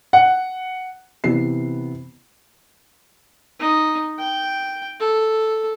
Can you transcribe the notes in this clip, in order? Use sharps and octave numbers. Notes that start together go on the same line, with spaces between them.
F#5
C3 E3 B3 C7
D#4
G5
A4